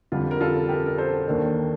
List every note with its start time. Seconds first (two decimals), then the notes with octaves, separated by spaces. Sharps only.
0.12 F2 D3 G3 F4
0.31 A#4
0.41 F4 A4
0.69 G4 A#4
0.86 A#4
0.98 A4 C5
1.27 D#2 D#3 A#3 D4